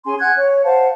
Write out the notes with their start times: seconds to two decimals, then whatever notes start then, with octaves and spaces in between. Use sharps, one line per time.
0.05 C#4 G#4 G#5 C6
0.19 F#5 G#5 F#6 G#6
0.35 C#5
0.64 C5 F5 F#5 A5